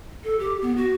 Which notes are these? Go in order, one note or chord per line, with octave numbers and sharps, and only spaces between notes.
A4
G4
B3
F#4